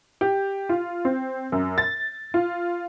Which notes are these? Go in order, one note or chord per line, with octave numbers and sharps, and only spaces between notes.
G4
F4
C4
F#2
A6
F4